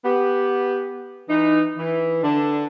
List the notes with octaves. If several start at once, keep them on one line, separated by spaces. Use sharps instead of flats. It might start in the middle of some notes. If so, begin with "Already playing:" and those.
B3 G4
E3 D#4
E3
D3 D4